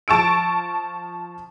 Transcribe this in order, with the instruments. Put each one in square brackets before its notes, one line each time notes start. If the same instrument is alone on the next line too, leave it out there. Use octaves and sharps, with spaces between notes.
[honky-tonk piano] F3 A5 C#6 E6 D7